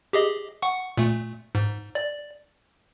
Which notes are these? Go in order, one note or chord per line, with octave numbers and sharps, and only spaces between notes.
G4 G#4 D#5
F#5 C#6
A#2 A3
G#2
D5